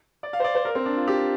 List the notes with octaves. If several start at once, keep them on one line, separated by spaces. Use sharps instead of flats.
D5
F5
C5
D5
C5
A#4
C4
D4
F4
G4